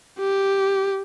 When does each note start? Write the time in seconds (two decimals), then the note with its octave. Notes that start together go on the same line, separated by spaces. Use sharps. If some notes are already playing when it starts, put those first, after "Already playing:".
0.19 G4